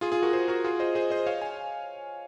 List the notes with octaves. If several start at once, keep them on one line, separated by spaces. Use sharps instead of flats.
F4 G#4
F4 G#4
F#4 A#4
G#4 C5
F#4 A#4
F4 G#4
C5 D#5
G#4 C5
C5 D#5
C#5 F5
G#5